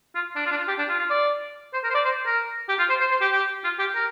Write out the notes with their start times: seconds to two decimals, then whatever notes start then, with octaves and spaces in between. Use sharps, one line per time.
0.15 F4
0.36 D4
0.46 F4
0.52 D4
0.57 F4
0.68 G4
0.79 D4
0.89 F4
0.99 F4
1.10 D5
1.74 C5
1.84 A#4
1.91 C5
1.95 D5
2.05 C5
2.26 A#4
2.69 G4
2.79 F4
2.90 C5
3.01 C5
3.11 C5
3.21 G4
3.32 G4
3.64 F4
3.79 G4
3.95 A#4